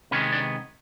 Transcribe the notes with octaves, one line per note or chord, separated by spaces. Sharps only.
C3 D#3 G#3 B3 C#4
D4